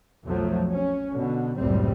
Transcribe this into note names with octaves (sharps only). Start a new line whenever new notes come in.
B1 F2 F3 F#3 A3
C#4
B2 D3
F#1 C#2 A2 G3 C4